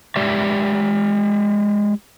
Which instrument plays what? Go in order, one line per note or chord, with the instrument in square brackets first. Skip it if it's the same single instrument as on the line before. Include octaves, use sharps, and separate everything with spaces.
[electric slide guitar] G#3 G4 D5 E5